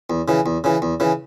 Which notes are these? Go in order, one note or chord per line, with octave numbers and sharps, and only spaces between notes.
E2
C#3 E3
E2
C#3 E3
E2
C#3 E3